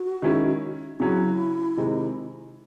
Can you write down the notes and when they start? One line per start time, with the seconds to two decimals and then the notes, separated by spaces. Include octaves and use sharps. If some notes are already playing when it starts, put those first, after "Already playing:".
Already playing: F#4
0.22 D#3 G#3 C#4 E4
1.00 C#3 F#3 C#4 E4 F#4
1.77 C3 D#3 G#3